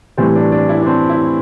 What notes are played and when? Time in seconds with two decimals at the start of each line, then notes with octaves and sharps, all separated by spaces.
0.18 A2 E3 G3 C4
0.35 D4
0.52 D4
0.69 E4
0.83 D4
0.87 C4
1.10 E4